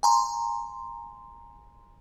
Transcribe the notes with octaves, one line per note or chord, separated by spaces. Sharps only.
G#5 A#5 C6